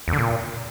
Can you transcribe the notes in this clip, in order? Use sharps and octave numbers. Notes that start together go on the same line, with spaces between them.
E2
D3
A#2